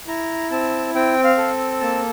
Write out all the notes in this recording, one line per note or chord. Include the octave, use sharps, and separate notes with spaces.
E4 A#5
C4 A5
C4 G5
F5
A4
A#3 A5